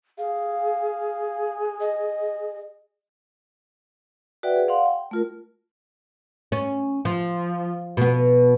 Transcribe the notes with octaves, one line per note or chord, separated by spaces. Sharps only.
G#4 F5
D#5
F#4 B4 D5 E5 F#5 G5
G#4
D5 F5 F#5 C6
G5
A3 F4 A#4
C#4
F3
B2 B3